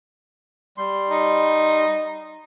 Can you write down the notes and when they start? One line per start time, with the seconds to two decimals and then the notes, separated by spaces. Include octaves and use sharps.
0.77 G3 C6
1.10 D#4